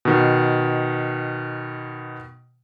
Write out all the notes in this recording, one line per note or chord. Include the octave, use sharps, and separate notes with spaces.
B2 D#3